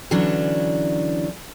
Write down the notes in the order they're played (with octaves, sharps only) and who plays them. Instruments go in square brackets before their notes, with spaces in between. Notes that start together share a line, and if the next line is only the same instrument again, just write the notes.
[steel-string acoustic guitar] D3 E3 F#3 C#4 D4